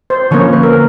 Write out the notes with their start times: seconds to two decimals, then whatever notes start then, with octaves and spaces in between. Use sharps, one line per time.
0.10 C5
0.31 D3 F3 A#3 C#4 C#5
0.53 B4
0.63 A#4